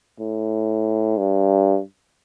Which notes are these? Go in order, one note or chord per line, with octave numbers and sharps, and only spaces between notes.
A2
G2